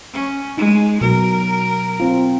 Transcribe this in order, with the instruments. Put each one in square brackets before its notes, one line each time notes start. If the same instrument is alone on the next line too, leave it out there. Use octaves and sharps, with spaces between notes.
[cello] C#4
[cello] G#3 [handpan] D#4
[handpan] B2 F#3 [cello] A#4
[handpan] C4 F4